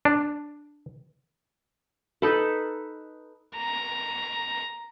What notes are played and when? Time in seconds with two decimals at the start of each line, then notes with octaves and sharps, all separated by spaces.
0.05 D4
2.22 D#4 A4 B4
3.58 A#5